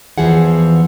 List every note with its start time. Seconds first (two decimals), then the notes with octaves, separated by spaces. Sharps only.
0.18 E2 E3 F3 G#4 F#5